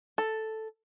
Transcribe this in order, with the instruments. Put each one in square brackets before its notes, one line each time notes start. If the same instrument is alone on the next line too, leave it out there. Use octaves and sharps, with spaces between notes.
[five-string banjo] A4